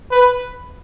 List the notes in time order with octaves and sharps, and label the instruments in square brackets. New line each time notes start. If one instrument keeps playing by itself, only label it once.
[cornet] B4